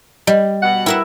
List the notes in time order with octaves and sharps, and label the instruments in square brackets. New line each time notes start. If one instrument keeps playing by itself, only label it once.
[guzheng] G3 [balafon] D#5
[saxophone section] B2 F#5
[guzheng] E4 A#4 E5 [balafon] G5